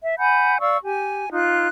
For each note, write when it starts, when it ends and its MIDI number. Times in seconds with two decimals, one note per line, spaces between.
0.02 0.14 76
0.18 0.58 78
0.18 0.58 80
0.18 0.58 83
0.18 0.58 91
0.60 0.77 74
0.60 0.77 77
0.60 0.77 85
0.60 0.77 88
0.84 1.28 67
0.84 1.28 80
1.32 1.68 63
1.32 1.68 65
1.32 1.68 90